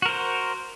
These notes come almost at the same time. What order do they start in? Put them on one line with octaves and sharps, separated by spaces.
F#4 A#4 C5